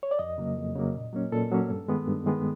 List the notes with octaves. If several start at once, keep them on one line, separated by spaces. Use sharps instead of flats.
C#5
D5
F2 D#5
C#3 F#3 A#3
F2
C#3 F#3 A#3
A#2
F#3 A#3 C#4
A#2 A4
F#3 A#3 C#4
G2
D#3 G#3 B3
G2
D#3 G#3 B3